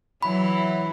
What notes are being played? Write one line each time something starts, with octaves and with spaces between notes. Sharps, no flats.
E3 F#3 E4 B5